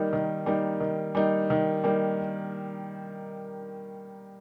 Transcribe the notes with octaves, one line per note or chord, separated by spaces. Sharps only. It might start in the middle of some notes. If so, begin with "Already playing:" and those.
Already playing: D#3 G3 A#3 D#4
D#3
G3 A#3 D#4
D#3
G3 A#3 D#4
D#3
G3 A#3 D#4